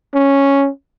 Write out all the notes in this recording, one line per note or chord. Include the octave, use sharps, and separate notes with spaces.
C#4